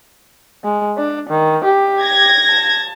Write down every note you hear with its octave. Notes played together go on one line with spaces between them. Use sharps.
G#3
D4
D#3
G4
G#6 A#6
A5